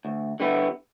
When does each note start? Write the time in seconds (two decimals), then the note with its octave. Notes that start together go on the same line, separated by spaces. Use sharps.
0.05 D2
0.40 D3 G3 B3 E4